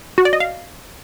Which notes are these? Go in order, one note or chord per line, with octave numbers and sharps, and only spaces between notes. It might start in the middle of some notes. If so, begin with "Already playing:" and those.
F#4
D5
D#5
F5